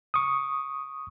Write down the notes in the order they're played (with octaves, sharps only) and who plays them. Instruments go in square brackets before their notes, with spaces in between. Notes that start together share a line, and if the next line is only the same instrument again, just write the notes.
[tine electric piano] C#6 D#6